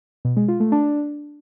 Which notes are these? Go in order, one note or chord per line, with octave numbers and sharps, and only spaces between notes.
B2
G#3
F4
A3
D4